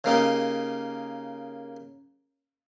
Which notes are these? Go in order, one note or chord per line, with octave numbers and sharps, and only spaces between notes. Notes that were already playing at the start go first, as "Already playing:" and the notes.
C#3 A#3 D#4 G4